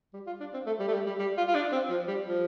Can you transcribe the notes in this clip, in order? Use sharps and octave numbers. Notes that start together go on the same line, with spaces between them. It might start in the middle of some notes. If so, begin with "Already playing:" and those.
G3
F4
D4
C4
A3
G3
A3
G3
G3
G3
F4
F4
D4
C4
F3
G3
F3